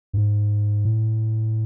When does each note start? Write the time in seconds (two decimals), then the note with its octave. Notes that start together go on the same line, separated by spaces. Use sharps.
0.13 G2
0.17 G#2
0.85 A2